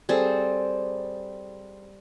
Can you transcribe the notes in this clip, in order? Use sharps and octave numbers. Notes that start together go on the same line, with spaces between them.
G3 C4 G#4 A4